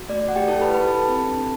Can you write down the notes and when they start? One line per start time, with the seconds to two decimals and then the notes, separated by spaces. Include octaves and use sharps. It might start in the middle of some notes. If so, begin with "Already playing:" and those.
Already playing: F#4
0.09 A3 D5
0.29 A3 F#5
0.36 G4 G5
0.48 E4 A4 A5
0.62 B4 B5
0.69 G4
0.74 B4 B5
0.87 E4 A4 A5
1.08 C4
1.27 D4